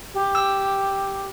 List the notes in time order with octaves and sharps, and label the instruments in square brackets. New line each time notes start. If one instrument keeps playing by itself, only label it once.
[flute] G4
[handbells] E6